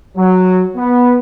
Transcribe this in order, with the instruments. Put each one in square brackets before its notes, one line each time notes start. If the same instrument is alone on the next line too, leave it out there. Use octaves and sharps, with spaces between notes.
[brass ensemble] F#3
B3